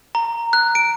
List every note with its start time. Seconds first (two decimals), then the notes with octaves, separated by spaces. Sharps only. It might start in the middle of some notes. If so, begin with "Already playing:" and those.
0.15 A#5
0.53 F#6
0.75 D7